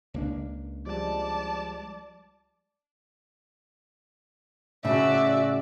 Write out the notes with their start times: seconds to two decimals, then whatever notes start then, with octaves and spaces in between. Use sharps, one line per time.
0.14 C#2 A#3 D4
0.86 F3 G3 G#3 D5 A5
4.85 A2 C#3 F#4 D5 E5